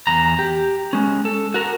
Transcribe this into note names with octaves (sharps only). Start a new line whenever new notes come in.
E2 A#5
G4
G#3 C#4
A4
F#4 A#4